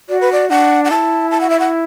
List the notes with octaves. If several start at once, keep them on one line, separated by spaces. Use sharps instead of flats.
F#4 D5
B4
D5
D4 F#5
F#5
E4 A5
A5
F#5
E5
F#5